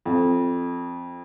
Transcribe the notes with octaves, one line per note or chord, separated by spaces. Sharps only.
F2